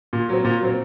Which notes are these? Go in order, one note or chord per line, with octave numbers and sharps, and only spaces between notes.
A#2
F#3 C4
A#2
F#3 C4